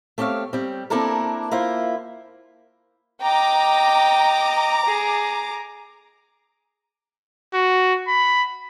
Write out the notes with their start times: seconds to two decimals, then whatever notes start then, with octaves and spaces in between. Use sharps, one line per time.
0.18 A3 C4 G4 C#5 F5
0.53 G3 C4
0.90 A#3 C4 D4 E4 A4 A#4
1.51 A#3 E4 F4 C5
3.22 D#5 G5 A#5 D6
4.86 G#4
7.54 F#4
8.08 B5